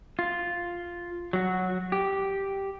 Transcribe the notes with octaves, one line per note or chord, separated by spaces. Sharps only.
F4
F#3 F#4
G4